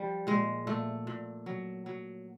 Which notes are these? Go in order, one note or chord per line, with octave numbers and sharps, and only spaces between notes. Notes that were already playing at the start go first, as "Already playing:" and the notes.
Already playing: F3 G3
A#2 G#3
A#2 A3
A#2
F#3
F#3